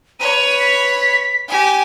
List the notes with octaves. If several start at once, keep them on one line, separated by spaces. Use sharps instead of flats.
B4 C#5 D#7
B6
G4 G#5